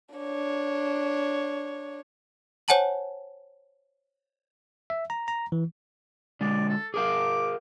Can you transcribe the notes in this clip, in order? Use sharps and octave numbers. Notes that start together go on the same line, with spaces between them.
D4 C#5
C5 C#5 F#5 G#5 A5 F#7
E5
A#5
A#5
E3
D3 G#3 D5
A4
G#4 A#4 F5 D6